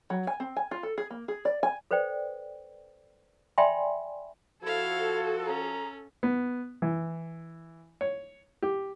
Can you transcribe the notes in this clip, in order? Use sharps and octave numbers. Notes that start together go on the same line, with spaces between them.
F#3
G#5
C4
G#5
F4
A4
G#4
A#3
G#4
D5
G#5
A4 B4 C5 D5 G5
D5 E5 G5 G#5 B5 C6
F3 E4 F#4 A4 F5 G#6
C#4 A#5
B3
E3
C#5
G4